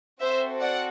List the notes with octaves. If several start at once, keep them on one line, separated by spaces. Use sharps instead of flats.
C4 F#4 A4 C5 E5
D5 F#5